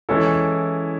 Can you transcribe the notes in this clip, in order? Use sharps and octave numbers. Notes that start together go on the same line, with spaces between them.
E3 G#3 C#4 E4 A4